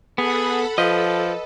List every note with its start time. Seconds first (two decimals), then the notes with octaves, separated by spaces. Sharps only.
0.18 B3 G#4 A4 F#5 B5
0.78 F3 A4 B4 D#5